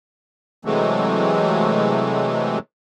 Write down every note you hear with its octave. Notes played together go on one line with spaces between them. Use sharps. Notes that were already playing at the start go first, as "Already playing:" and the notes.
C3 E3 F#3 G#3 A3